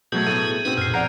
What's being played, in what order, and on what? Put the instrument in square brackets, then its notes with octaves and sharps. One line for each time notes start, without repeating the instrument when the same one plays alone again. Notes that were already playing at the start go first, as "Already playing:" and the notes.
[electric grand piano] B2 F#3 A3 [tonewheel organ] B3 G#4 [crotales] G6 G#6
[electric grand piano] A2 A4 [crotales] D#7
[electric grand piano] B2 C4 [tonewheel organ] C#4 D#4 B4
[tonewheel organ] F#2 A#2 G#4 [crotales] F6 C7
[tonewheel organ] F3 [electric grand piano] D5 F#5 A#5 [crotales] G6 C7 D7